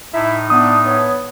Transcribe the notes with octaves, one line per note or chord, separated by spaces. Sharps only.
A2 D#4 E4 E5
B3 D4 D#6
B3 C#5